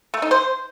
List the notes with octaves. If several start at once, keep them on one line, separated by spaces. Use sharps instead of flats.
A3
D#4
C5